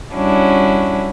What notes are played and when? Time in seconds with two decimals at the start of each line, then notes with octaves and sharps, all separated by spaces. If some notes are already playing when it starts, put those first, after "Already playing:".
0.14 G3 C#4 D4 E4 F#4